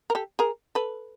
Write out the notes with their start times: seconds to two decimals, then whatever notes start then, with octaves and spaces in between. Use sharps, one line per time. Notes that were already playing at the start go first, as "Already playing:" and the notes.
0.10 A#4
0.15 G4 A4
0.39 G#4 A#4
0.75 A4 B4